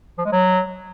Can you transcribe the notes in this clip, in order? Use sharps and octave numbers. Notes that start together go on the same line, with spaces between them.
F3
G#3
F#3